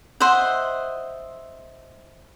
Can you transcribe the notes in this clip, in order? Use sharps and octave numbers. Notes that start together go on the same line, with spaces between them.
C5 D#5 E5 F#5